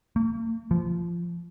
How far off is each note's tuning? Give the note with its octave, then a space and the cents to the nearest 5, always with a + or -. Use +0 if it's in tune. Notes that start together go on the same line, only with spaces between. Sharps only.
A#3 -45
F3 -20